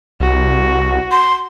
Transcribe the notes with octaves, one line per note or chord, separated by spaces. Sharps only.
C2 F#4
C6